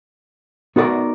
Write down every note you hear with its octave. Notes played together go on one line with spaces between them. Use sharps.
B3 D#4 F#4 A#4 D5